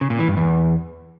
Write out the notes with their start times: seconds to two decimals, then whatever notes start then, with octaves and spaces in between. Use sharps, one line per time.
0.01 C#3
0.10 A#2
0.19 E3
0.28 G2
0.37 E2